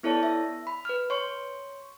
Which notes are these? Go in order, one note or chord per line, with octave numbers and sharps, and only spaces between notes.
B3 E4 A4 C#5 D5 A5
E5
B5
B4 F6
C#5 C6 C#6